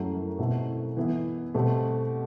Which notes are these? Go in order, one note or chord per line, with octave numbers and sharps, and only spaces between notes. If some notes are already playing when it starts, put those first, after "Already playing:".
Already playing: F#2 F#3 A3 E4 G4
B2 A3 C4 E4
E3 B3 E4
B2 A3 C4 G4